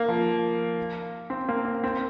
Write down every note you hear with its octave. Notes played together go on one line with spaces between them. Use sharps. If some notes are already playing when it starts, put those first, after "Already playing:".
Already playing: A#3
F3
C4
A#3
A#3
C4